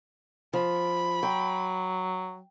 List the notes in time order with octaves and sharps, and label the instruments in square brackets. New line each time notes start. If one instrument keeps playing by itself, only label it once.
[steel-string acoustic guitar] F3 [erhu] B5
[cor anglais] F#3 [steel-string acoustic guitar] G5